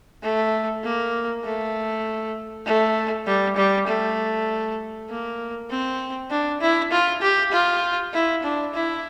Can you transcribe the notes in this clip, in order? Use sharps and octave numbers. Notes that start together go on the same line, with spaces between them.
A3
A#3
A3
A3
G3
G3
A3
A#3
C4
D4
E4
F4
G4
F4
E4
D4
E4